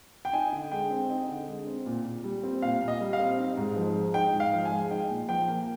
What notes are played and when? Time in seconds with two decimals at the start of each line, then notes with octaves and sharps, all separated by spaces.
0.25 G5
0.33 D#4 G#5
0.52 D3
0.72 G#3 G5
0.91 C4
1.10 D#4
1.29 D3
1.48 G#3
1.67 C4
1.86 A#2
2.05 A#2
2.24 G3
2.43 C4
2.62 A#2 F5
2.81 A#2
2.88 D#5
3.01 G3
3.13 F5
3.20 C4
3.38 D#4
3.57 G#2
3.76 F3
3.96 G#3
4.14 D#4 G5
4.34 G#2
4.40 F5
4.53 F3
4.65 G#5
4.72 G#3
4.91 D#4 G5
5.10 A#2
5.29 F3 G5
5.48 A#3